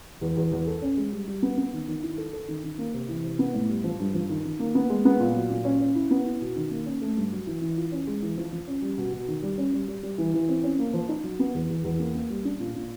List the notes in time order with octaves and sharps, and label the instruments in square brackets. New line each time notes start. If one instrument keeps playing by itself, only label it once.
[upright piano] E2
E2
E2
A4
C#4
G#3
G3
G3
B3
B3
D#3
D#3
E4
A4
A4
D#3
D#3
A#3
C3
E3
C3
B3
A2
G3
F3
G2
F3
D#3
D#3
A#3
B3
G#3
B3
A#2
F#3
A#2
C#4
C#4
E4
B3
E4
B2
D#3
A#3
C#4
A3
G2
F#3
E3
E3
F4
C#4
G#3
E3
F3
F3
C#4
G3
B2
B2
D#3
G3
C#4
G3
G3
G3
E3
E3
C4
C#4
A#3
F3
D#4
F#3
B3
E2
E2
E2
A#3
A#3
G3
D4
A#2
A#2